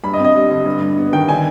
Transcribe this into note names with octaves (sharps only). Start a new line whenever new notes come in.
G2 B5
D#5
C4
D#5
G3
D3
G2
G2
B3
D#3 G5
D3 G#5